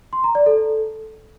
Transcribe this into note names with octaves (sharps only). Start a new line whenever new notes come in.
C6
A#5
D5
A4